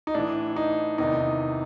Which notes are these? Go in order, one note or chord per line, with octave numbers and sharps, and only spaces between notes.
D#4
A2 E3 D4
D#4
E2 C3 D#3 D#4